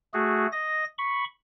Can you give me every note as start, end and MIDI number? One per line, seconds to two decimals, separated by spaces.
0.14 0.47 57
0.14 0.47 66
0.14 0.47 68
0.52 0.85 75
0.52 0.85 94
0.98 1.24 83
0.98 1.24 85